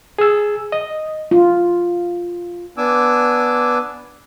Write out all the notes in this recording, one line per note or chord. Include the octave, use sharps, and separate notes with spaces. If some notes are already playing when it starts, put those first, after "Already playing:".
G#4 E6
D#5
F4
B3 D4 G#5 D6 E6